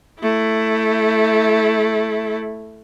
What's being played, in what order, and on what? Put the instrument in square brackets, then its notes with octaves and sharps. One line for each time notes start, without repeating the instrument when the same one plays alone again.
[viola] A3 E4